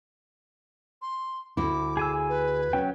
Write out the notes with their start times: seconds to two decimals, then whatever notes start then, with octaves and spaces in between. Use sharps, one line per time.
1.02 C6
1.57 D2 E4 D6
1.97 G#4 G#5 E6
2.29 B4
2.73 F#3 C#4 G5